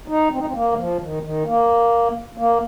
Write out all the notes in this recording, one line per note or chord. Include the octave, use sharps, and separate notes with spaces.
D#4
C4
D#4
C4
A#3
D#3
F3
D#3
D#3
A#3
A#3